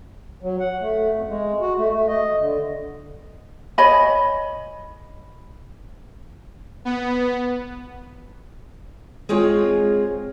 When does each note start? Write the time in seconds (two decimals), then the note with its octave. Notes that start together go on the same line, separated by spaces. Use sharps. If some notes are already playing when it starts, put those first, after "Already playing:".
0.43 F#3
0.60 F#5
0.81 A3
1.15 F2
1.28 G#3
1.61 F#4
1.77 A3
1.93 A3
2.07 D#5
2.39 D3
3.78 C#5 D#5 G#5 B5
6.85 B3
9.29 G#3 C4 F4 G#4 C#5